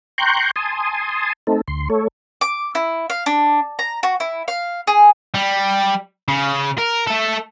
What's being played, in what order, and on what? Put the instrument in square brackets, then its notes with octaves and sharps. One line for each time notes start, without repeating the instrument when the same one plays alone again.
[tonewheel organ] G5 A#5 C6 C#6 F#6 G6
G#5 A5 C6 D#6
A3 C4 D#4 A4
D2 C6
A3 A4 C#5
[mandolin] D6
E4
F5
D4
A#5
F#4
E4
F5
G#4
[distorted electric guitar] G3
C#3
A#4
A3 A4